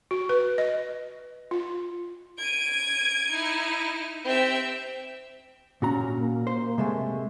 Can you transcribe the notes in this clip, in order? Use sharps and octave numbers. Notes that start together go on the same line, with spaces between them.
F#4
B4
D#5
F4
G#6 D7 D#7
D#4 E4
C4 G4 E5
A#2 C#4 F#4 A#5
A#3
C5
C3 G#3 A3